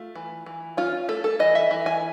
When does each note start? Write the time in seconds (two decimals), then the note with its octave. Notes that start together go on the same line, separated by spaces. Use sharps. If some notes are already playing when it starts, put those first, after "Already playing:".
Already playing: A3 F4
0.15 E3
0.46 E3
0.77 C#4 F4
1.08 A3 A4
1.24 A4
1.39 E3 D#5
1.55 E5
1.71 E3
1.86 G#5